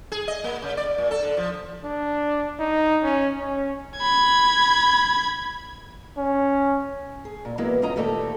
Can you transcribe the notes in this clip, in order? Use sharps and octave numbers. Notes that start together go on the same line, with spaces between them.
G#4
D#5
A#3
C#3
D5
A#2
A4
D3
F3
D4
D#4
C#4
C#4
B5 G#6
C#4
G#4
A#2
E3 F#3 G#3 A#3 B3 E4
F#2 C#4 F4 D#5 A#5
A#2 D#3 A3 C4 G4 A4